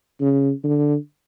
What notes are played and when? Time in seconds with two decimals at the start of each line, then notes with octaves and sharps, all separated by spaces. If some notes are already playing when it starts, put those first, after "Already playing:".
0.21 C#3
0.64 D3